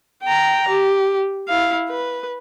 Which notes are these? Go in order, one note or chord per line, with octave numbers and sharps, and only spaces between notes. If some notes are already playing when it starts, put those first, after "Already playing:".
G5 A#5
G4
E4 F5
B4